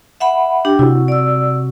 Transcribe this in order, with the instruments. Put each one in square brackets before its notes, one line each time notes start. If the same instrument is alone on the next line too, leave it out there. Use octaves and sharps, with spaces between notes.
[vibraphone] E5 F#5 B5
D4 G4 G5
[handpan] C3 F#4 [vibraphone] E4
[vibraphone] D5 E6